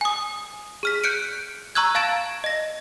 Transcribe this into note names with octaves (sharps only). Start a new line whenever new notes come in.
G#5 D#6
G#4 F6 B6
F#6 G6 C#7 D7
A#5 C#6 E6 F#6 G#6
F5 A5 A6 D7 E7
D#5 A#6